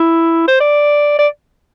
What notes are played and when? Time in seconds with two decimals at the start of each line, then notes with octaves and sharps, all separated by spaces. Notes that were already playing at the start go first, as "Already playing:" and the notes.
Already playing: E4
0.48 C5
0.60 D5
1.19 D5